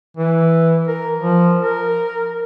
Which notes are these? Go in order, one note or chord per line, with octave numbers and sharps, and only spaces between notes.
E3
A#4
F3
A#4